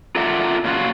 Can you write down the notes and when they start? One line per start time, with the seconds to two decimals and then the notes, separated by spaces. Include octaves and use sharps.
0.16 F4 A4 A#4 D5 E5 F#5
0.64 A#2 C#4 F4 F#4